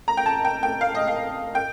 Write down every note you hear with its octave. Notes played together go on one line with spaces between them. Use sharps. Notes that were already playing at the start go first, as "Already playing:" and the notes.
A#5
G5
A5
G5
G5
F5
D#5
F5
G5